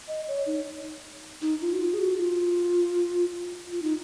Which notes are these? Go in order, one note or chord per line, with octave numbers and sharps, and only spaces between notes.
D#5
C#5
D#4
D#4
F4
F#4
F4
G#4
F#4
F4
F4
D#4